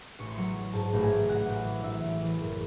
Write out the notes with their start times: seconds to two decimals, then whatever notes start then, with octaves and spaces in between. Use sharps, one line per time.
0.19 A1 C#6
0.27 C6
0.35 F#3 C#6
0.56 F#3
0.73 G#2 A5
0.93 A1
1.01 G#5
1.11 A1
1.28 A1 F#5
1.47 A1
1.65 E3
1.83 A1 E5
2.03 A1
2.21 E3
2.39 F#1